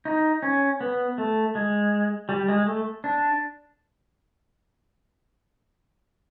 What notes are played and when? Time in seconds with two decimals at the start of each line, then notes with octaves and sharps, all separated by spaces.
0.05 D#4
0.43 C#4
0.81 B3
1.18 A3
1.55 G#3
2.29 G3
2.48 G#3
2.67 A3
3.04 D4